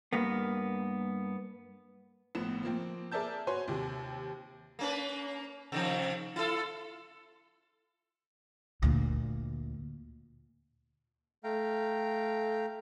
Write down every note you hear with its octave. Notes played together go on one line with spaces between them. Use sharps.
G2 A#3 B3
A#1 A2 B3 E7
F3 A#3 C4
G#4 A#4 D5 E5 A5 G6
F#4 B4 C#5 G#5 C6
D#2 C3
A#3 C#4 B4
C3 D#3 F3
E4 F4 A4
D2 A#2
A3 F5 G5 A#5